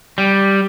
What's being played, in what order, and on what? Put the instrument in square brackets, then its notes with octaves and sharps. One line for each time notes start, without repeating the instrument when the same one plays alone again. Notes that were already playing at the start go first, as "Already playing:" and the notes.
[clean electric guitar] G3